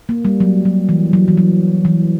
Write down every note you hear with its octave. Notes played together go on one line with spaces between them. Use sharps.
A#3
G3
F#3
F#3
E3
F#3
E3
F#3
E3